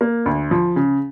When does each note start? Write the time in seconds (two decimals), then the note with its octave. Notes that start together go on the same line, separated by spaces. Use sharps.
0.01 A#3
0.26 D2
0.51 F3
0.76 C#3